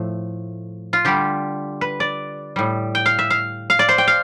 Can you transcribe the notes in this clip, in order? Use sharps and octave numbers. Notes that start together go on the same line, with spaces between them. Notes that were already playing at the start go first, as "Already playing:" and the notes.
Already playing: A2 F3 A3
F4
D3 G3 G4
B4
D5
A2 G3
G5
F5
E5
F5
F5
D5
C5
G5
F5